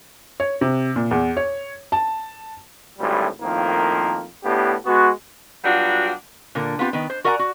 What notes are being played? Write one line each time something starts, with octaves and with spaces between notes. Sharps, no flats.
C#5
C3
A#2
E2
C#5
A5
G#1 D2 A2 G3
F2 A2 D#3 F3 A#3
A2 B3 D4 G4
G#3 B3 F#4
F#3 G3 B3 D4 F4 F#4
A#2 D3 A#4
B3 C4 F4 G4
D#3 B3
C5
F#4 A#4 D5 F#5 G#5 A#5
F#4